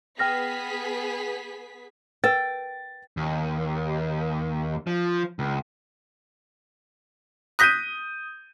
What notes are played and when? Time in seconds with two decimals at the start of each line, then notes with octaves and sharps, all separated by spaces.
0.19 B3 G#4 G5 F6 A#6 B6
2.24 A#4 B4 G5 A6
3.17 D#2
4.87 F3
5.39 C#2
7.59 D#6 F#6 G6 A#6 B6 D#7